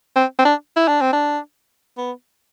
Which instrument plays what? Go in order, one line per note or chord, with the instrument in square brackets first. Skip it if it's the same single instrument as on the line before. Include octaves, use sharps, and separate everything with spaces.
[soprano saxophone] C4
C4
D4
E4
D4
C4
D4
B3